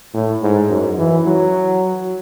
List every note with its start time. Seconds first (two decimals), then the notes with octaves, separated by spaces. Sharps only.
0.14 A2
0.43 G#2
0.70 F#2
0.99 E3
1.27 F#3